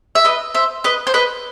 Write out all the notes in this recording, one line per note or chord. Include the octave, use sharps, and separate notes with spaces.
E5
B4 D#5
C5 E5
B4 D#5
C5
B4 D#5